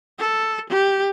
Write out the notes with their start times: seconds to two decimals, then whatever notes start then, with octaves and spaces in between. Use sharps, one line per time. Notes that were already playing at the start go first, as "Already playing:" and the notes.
0.19 A4
0.70 G4